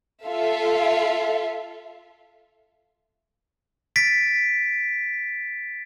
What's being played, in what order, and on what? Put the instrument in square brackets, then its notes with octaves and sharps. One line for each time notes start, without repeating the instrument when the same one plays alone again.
[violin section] F4 A4 E5 F5
[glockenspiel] A6 B6 D7